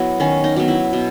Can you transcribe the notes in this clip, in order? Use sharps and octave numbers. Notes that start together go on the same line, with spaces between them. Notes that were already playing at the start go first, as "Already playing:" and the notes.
Already playing: F#3 B3 E4
D#3 C#4
D#4
F#3 B3
E4
B2